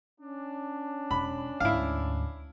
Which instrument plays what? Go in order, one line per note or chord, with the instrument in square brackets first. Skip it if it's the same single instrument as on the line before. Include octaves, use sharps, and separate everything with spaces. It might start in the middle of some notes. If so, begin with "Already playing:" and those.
[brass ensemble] C#4 D4
[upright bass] E1 [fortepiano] B5
[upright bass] D2 G#2 [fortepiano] E4 F5